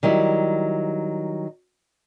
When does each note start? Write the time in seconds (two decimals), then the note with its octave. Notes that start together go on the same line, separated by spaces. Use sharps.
0.03 D#3 F#3 G3 E4